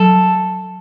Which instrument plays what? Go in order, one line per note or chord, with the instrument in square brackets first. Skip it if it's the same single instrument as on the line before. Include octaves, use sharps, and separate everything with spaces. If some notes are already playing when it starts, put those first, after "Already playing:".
Already playing: [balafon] F#3 [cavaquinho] A4